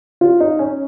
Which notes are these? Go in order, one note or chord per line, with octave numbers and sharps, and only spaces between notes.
F4
D#4
C#4